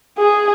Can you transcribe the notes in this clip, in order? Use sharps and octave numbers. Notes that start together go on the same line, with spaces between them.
G#4